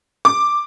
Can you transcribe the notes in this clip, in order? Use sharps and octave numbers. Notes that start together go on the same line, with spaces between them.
D6